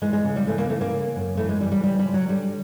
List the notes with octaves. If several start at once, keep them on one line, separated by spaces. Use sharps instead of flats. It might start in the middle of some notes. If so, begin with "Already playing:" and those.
E3 G#3
G#3
C#3
G3
E3 A3
A#3
E3 A3
A#3
C#3
F#2
E3 A3
G#3
E3 G3
G3
C#3 G3
G3
F3
F#3
D3 G3